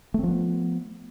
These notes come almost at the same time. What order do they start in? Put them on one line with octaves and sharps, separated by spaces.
A3 C4 F3 B3